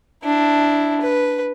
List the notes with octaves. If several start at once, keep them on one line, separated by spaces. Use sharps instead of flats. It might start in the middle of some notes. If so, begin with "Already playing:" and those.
D4 E4
B4